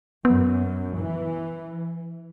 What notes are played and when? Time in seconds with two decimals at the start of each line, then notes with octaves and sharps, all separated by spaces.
0.25 F#2 B3
0.98 E3